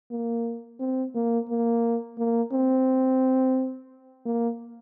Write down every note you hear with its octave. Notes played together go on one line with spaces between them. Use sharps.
A#3
C4
A#3
A#3
A#3
C4
A#3